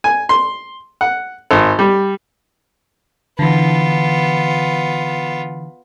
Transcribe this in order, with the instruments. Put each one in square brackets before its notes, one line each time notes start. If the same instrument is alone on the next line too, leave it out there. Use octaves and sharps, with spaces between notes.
[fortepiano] G#5
C6
F#5
G#1
G3
[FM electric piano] D3 E3 [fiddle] B3 F4